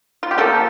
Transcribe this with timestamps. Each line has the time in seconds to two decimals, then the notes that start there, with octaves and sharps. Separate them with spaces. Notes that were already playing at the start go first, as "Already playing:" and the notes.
0.23 F4
0.31 G4
0.38 F3 A#3 F4 A4